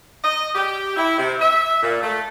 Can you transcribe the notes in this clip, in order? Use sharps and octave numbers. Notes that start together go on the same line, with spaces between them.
D#5
G4
E4
C3
E5
A#2
A3